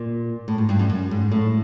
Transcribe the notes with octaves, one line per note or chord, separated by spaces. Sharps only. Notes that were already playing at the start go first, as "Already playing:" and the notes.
Already playing: A#2
A2
G#2
G2
F#2
F#2
G#2
A2